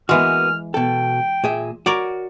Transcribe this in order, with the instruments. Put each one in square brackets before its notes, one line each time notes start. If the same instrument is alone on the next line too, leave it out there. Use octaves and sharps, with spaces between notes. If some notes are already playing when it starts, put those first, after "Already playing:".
[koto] E3 G#3 [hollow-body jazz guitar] A#3 B3 F#4 [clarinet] F6
[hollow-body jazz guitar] B2 A4 [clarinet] G5
[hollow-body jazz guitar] A#2 G#4 E5
[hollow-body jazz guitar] F#4 [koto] A#4 C#5 D5